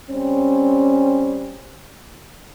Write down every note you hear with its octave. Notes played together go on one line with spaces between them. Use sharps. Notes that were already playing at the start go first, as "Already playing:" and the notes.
G3 C4 C#4